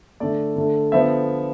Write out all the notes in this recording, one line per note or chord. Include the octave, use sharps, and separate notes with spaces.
D3 A3 D5
D3 A3
D3 F3 B3 E5